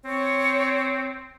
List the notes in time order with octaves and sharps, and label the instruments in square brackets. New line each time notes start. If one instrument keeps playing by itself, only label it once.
[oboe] C4 [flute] C#5